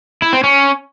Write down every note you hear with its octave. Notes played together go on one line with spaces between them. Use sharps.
E4
C4
C#4